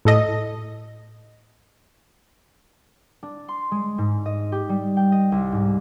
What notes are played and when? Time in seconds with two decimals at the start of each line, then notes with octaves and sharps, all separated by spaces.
0.05 A2 A4 D#5
3.23 D4
3.48 C6
3.71 G#3
3.98 G#2
4.26 D#5
4.52 G4
4.69 G3
4.97 G5
5.12 D#5
5.32 C2
5.52 G#2